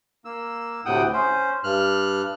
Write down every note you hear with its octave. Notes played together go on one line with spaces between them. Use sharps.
A#3 E6
D2 A2 C3 F#5 G5 D#6
C#4 C5
G2 F6 F#6